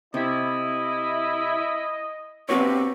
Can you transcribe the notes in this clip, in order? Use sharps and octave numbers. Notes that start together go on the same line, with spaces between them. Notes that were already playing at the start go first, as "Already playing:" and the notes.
C3 E4 D#5
G2 C3 C4 F#4 B4 C#5